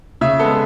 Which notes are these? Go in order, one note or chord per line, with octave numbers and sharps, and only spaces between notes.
C#3 E5
G#3 B3 A4